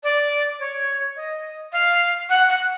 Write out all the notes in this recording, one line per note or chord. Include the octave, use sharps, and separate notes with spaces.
D5
C#5
D#5
F5
F#5
F#5